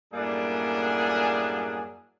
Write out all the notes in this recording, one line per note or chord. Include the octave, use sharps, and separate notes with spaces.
F#2 A2 G3 A#3 D4 G#4